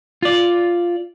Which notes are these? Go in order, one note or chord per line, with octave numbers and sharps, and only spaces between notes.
F4 D5